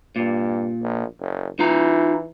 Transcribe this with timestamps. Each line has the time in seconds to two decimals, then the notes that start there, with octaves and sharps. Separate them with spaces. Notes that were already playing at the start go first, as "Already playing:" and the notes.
0.16 G2 A#2
0.82 A#1
1.19 F#1
1.59 E3 D#4 F4 A#5